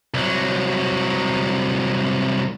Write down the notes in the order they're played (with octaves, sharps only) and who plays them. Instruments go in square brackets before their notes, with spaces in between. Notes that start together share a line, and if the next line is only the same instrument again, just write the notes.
[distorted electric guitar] C2 F#3